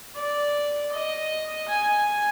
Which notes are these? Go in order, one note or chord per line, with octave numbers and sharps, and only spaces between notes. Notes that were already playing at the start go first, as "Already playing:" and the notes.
D5
D#5
G#5